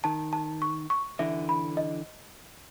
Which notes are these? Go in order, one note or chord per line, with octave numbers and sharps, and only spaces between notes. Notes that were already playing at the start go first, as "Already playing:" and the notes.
D#3 A5
A5
C#6
C#6
D3 E3 E5
B5
D#5